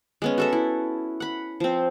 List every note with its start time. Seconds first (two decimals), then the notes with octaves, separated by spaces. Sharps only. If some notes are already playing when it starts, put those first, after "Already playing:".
0.22 G#3 B3 C#4
0.38 F#4 A4 E5
0.53 E4
1.20 F#5 B5
1.60 F3 C4